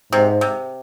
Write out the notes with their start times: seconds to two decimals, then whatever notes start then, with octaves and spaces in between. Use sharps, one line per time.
0.13 G#2 C3
0.41 C3